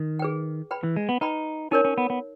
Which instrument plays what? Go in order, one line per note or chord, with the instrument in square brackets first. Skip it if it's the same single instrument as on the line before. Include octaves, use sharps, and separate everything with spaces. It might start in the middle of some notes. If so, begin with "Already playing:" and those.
Already playing: [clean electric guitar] D#3
[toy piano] G#4 B4 G5
B4 G5 B5
[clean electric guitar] E3
G#3
B3
[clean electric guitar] D#4 [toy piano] B4 G5 B5
[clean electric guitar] C#4 [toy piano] D#4 A#4 C#5
[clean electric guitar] C#4
B3
B3